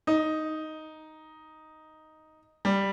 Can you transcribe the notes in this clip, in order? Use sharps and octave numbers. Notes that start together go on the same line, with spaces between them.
D#4
G3